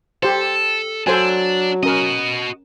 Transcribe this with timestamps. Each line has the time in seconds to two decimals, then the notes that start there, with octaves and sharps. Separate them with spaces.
0.23 G4 A4 C5
1.07 F#3 D4 A4 C5 G#5
1.83 C#4 F#4 A#4 D#5